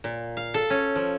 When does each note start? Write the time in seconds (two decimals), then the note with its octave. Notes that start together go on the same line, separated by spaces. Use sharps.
0.04 A#2
0.37 F5
0.54 A4
0.70 C#4
0.96 F3